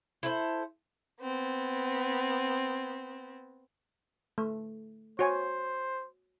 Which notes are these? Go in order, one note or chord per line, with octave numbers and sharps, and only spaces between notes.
E4 A4 C5
B3 C4
A3
F#4 C5 C#5 G#5